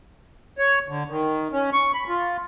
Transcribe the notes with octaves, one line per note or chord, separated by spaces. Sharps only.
C#5
D3
D#3
C#4
C#6
B5
F4